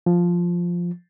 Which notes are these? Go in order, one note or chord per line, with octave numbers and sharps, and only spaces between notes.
F3